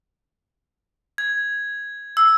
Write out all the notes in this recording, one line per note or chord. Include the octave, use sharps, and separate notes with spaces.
G#6
E6